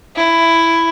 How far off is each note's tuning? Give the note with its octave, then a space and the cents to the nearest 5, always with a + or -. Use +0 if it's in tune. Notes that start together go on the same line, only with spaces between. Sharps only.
E4 +10